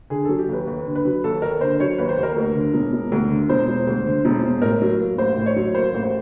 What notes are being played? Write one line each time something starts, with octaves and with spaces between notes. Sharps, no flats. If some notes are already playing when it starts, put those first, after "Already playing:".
D3 G#4
F#3 A4
G4
D#2 B4
D#2 B4
D3
B4
F#3
D#2 A4
D#2 A#4
D3 C5
F#3 C#5
D#2 B4
C5
D#2 A#4
D2
D3
E1
E1
D2
D3
E1 C5
E1
D2
D3
E1
E1
A2 A#4
F#3
A#3
A1 C5
A2
C#5
F#3
A#3 C5
A1
C5